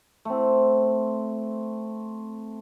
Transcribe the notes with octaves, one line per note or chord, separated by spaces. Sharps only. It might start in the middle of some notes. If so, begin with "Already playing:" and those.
A3 C4